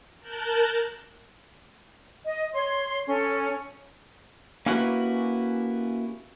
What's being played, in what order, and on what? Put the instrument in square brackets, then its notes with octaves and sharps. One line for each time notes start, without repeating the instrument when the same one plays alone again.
[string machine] A#4 A5 F#6 G6
[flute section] D#5
C#5 C6
C#4 A4
[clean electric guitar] A#3 C#4 E4 F#4 G4 B4